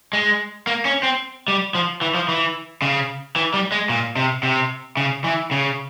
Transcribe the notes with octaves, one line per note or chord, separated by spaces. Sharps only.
G#3
A#3
C#4
C4
G3
F3
E3
F3
E3
C#3
E3
G3
G#3
A#2
C3
C3
C#3
E3
C#3